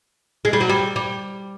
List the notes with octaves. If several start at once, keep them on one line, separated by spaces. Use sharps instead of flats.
G#3
G3
F#3
G3
G3